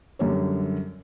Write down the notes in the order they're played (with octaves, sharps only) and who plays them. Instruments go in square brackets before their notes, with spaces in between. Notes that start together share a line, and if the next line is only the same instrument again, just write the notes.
[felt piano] F#2 D3 G3 C#5